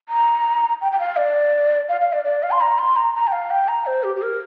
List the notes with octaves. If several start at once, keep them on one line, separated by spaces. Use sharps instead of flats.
A#5
G5
G5
F5
D5
F5
F5
D5
D5
F5
C6
A#5
C6
A#5
A#5
G5
F5
G5
A#5
C5
G4
G4
A#4